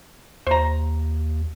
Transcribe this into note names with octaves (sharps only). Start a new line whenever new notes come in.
D#2 C5 A#5